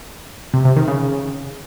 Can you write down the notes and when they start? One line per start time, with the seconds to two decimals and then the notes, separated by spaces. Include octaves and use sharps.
0.54 C3
0.65 C3
0.76 D#3
0.88 C#3